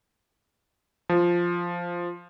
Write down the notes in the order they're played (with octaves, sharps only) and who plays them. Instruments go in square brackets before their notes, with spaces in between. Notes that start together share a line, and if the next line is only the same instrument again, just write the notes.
[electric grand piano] F3